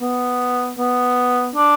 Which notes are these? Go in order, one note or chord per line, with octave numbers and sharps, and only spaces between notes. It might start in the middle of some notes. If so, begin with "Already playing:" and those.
B3
B3
D4